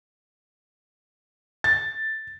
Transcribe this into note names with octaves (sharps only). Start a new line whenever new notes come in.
A6